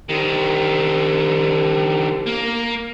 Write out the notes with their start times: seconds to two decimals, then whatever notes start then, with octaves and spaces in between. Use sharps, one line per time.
0.09 C2 D3 D#3
2.26 A#3